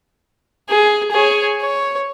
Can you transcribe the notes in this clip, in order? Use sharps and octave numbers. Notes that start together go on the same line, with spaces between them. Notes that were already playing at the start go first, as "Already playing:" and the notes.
G#4
G#4 C#5
C#5